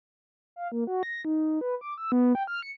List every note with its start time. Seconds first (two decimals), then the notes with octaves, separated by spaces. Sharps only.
0.56 F5
0.72 A#3
0.87 F#4
1.03 A#6
1.25 D#4
1.61 B4
1.81 D6
1.98 E6
2.12 B3
2.35 G5
2.47 F6
2.62 C#7